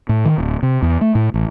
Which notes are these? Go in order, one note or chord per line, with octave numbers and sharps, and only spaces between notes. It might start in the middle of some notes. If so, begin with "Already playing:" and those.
A2
D#3
D1
C3
E2
A3
A2
A1